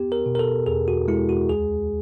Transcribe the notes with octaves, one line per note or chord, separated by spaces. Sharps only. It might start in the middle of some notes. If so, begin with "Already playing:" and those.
Already playing: B3 G4
A#4
B2
A#4
A4
E2 G#4
F#4
G#3 E4
F#4
D2 G#4